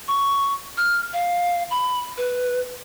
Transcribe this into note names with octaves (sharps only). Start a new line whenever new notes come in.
C#6
F6
F5
B5
B4